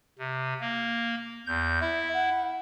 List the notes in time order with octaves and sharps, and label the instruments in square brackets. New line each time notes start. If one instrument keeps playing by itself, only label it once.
[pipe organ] C3
A#3
E2 G6
[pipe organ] E4 [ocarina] E5
[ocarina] F#5